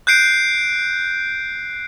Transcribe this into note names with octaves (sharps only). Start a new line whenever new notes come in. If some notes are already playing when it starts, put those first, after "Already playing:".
F#6 G6 C7 D7